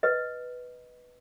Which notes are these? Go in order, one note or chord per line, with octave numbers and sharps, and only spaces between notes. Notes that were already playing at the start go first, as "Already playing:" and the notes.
B4 D#5